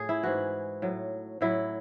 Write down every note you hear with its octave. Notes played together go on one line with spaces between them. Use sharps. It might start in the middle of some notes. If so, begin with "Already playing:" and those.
Already playing: A2 G#4
E4
G#2 E3 F#4
A2 F#3
A2 F#3 E4